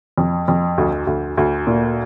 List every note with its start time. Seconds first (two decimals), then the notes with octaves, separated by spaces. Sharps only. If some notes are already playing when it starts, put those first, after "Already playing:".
0.18 F2
0.48 F2
0.78 D2
1.07 D2
1.37 D2
1.67 A#2